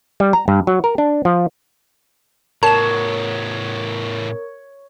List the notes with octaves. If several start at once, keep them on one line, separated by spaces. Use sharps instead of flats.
G3
A#5
G2
F#3
A#4
D4
F3
A2 B3 A#4 C#5 A5 E7